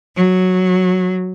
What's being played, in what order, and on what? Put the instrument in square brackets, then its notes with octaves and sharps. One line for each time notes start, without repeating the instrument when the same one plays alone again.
[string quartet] F#3